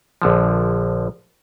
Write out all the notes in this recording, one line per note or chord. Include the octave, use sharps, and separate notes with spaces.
A#1 D3 F3